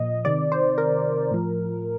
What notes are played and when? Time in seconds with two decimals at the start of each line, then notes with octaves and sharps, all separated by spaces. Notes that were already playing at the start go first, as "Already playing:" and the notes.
Already playing: A#2 F3 D#5
0.25 C3 D#3 D5
0.52 C5
0.78 A#4
1.31 A2 F3